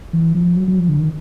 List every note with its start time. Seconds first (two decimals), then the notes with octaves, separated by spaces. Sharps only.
0.13 E3
0.35 F3
0.56 F#3
0.68 F#3
0.79 F3
0.89 D3
0.99 D#3